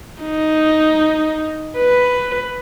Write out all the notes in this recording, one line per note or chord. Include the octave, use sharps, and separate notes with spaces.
D#4
B4